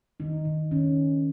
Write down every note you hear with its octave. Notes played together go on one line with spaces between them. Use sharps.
D#3 D#4
D#3
D#3 C#4